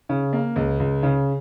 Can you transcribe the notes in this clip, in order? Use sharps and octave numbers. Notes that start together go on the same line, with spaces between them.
C#3
A#3
C#2
C#2
C#3